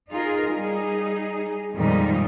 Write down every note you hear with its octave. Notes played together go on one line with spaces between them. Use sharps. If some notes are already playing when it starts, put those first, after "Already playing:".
D#4 F4 G#4 A#4
G3 D#4 G#4
F2 A#2 D#3 G3 G#3 D#4